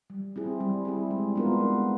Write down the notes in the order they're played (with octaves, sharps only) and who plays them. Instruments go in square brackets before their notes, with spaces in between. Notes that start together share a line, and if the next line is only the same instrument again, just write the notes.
[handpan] G3
C4 E4 G#4
G3
C4 E4 G#4
G#3
B3 D4 F4 A#4
G#3